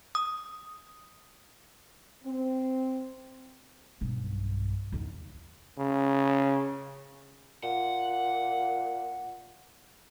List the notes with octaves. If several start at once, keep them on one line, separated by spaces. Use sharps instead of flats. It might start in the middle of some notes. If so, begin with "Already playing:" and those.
D#6
C4
B1 G2
E2 D#3
C#3
A#2 F#5